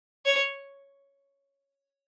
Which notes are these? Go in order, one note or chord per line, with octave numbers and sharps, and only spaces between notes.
C#5